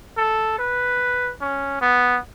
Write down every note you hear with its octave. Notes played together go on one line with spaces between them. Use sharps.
A4
B4
C#4
B3